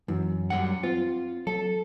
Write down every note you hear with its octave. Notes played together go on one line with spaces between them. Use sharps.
F#2 E3
F#2 G3 F#5
C4 F4
F#3 A4